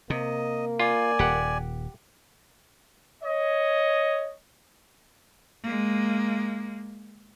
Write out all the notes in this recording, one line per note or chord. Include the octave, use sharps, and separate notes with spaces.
C3 A#3 D#5
F4 D5 G#5
D#1 G4 F#5
C#5 D#5
G#3 A#3